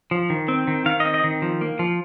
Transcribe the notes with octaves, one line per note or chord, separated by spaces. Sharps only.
F3
D#3
C4
D#3
D#3 F5
C4 D#5
D#5
D#3
F3
A#3
F3